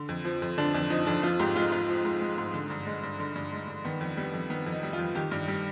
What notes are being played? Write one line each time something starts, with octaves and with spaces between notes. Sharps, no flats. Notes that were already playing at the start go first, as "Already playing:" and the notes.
Already playing: D3
F2
F3
F2
D3 D4
F2 D4
F3 D#4
F2 D4
F3 F4
G#2 G4
G#3 F4
G#2 F4
F3
G#2
G#3
G#2
D3
G2
G#3
G2
D3
G2
G#3
G2
D#3 B3
F2
G3 B3
F2
D#3 B3
F2
D#4
G3
F4
F2
D#3 G4
G2
G3